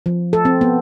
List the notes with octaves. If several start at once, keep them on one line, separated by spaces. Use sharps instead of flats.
F3
A4
C4
B3